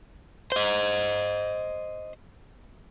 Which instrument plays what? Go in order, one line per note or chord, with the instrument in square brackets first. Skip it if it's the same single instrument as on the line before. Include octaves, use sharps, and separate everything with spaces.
[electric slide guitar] C5 D#5